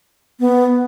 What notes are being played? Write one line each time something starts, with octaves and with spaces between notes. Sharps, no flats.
B3